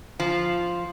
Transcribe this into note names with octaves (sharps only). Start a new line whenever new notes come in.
F3